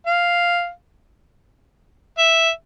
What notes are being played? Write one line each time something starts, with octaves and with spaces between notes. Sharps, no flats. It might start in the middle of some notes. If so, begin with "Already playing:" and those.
F5
E5